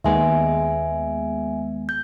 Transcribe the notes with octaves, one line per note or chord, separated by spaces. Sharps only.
D#2 G#3 B3 E5 G#5
G6